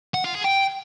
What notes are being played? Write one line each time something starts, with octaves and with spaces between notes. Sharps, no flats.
F#5
F4
G#4
G5